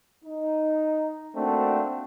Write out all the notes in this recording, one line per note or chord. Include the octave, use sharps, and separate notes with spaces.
D#4
A3 A#3 C4 D4 F#4